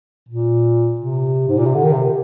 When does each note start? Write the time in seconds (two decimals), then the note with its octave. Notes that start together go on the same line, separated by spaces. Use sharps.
0.28 A#2
1.01 C3
1.48 G#2
1.57 A#2
1.66 C3
1.74 D3
1.84 D#3
1.93 C3